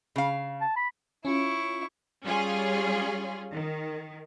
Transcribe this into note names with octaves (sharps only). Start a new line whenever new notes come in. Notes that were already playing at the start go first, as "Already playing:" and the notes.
C#3 F5
A5
B5
C#4 E4 F4 C#6
G3 C#4 F4 G#4
D#3